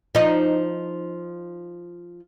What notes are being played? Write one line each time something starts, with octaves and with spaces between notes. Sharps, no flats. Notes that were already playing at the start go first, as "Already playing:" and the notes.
F3 D#4